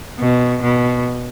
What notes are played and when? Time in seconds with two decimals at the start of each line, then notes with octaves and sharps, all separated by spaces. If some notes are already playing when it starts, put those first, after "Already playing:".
0.19 B2
0.61 B2